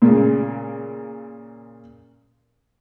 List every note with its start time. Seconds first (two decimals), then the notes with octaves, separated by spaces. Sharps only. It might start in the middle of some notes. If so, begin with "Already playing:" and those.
0.02 A#2 C#3